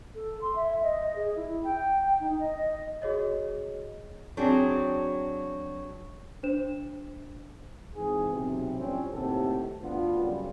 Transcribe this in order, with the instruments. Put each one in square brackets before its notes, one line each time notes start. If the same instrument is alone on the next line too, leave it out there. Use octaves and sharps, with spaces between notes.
[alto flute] A4
C6
E5
D#5
G#4
E4
G5
D#4
D#5
D#5
[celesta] F#4 G#4 C#5 D#5
[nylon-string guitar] F#3 C4 D4 F#4 G#4
[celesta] D4 C5 E7
[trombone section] G#1 G#2 E3 C4 G#4
B1 C3 B3
F2 A2 G3 C4 C#4
D#2 A2 C3 D#3 F#4 A4
D2 G2 B3 D4 F4
F#2 C#3 G3